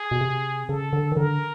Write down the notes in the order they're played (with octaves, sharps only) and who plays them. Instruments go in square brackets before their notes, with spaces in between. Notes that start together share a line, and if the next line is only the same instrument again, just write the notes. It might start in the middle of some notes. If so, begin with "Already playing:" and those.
Already playing: [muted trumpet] G#4
[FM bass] B2
C3
[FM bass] C#3 [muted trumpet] A4
[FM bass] D3
D#3
[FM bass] D3 [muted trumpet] A#4